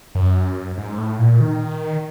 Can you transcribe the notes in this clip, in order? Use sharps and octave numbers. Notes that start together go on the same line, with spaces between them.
F#2
G#2
A2
A#2
D#3